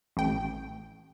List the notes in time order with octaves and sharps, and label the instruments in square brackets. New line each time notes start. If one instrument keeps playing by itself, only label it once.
[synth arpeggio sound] A1 G5